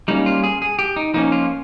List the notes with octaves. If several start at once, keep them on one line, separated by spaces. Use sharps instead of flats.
G3 A#3 C#4 D#4
F4
G#4
G#4
G4
D#4
F3 A#3 C#4 D#4
F4